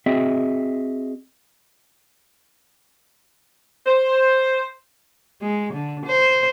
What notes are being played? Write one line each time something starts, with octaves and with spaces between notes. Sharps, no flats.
C4 F#4 G#4 D#5 E5
C5
G#3
D3
C5